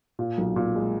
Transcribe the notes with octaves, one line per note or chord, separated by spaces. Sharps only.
A#2
B1
A#2
G#3